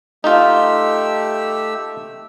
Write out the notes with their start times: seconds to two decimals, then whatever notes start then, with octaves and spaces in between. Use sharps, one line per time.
0.24 A3 D#4 F4 G4 E6